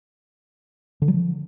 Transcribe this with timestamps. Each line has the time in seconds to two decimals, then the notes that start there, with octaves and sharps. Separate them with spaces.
1.02 D3
1.08 F#3
1.14 F3